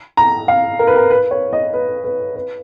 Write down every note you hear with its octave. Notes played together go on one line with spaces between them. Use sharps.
A#5
F5
A#4
B4
A#4
B4
C#5
D#5
B4
B4
B4